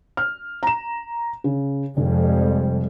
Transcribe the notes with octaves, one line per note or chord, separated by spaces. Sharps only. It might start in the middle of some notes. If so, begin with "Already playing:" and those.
F6
A#5 E7
C#3
F1 F2 G3 G#3